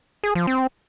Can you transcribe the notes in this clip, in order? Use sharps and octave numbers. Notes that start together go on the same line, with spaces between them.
G#4
F3
C4